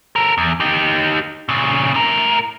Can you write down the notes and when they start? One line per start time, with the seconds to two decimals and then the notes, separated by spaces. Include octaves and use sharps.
0.16 A4 A#4
0.38 E2
0.60 D#4 G4
1.49 A#2 C#3
1.94 A2 A#4